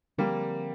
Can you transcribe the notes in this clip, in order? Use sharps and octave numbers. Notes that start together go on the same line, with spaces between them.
D3 F3 G3 A#3 C4